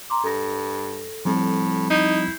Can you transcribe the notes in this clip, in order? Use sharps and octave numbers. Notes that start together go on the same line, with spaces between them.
A#5 C6 D6
G2 A4 A#6
A2 F3 G3 C4
D#4 E4 G6 C7